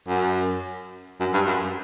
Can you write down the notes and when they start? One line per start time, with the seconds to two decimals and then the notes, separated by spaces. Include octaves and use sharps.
0.08 F#2
1.20 F#2
1.34 G2
1.47 F#2